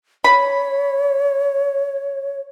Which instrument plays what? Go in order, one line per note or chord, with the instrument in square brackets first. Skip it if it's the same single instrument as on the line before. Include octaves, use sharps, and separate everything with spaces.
[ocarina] C#5 [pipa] B5